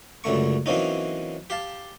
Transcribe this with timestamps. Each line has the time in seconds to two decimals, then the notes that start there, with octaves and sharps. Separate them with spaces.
0.24 C#2 F#2 D3 A3 C#6
0.66 E3 F#3 A#3 C4 C#4 D#4
1.50 G4 F5 A5